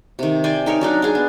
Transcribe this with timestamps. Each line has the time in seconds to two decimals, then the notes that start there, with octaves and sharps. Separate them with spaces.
0.19 C3 D#3
0.44 C5 D5 G5 G#5
0.66 D#4 A#4 C#5
0.81 F#3 D4 D#4
1.02 D4 G#4
1.15 B3